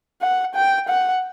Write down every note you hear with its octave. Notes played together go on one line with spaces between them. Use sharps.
F#5
G5
F#5